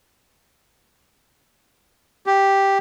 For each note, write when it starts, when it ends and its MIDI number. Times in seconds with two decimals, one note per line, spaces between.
2.26 2.78 67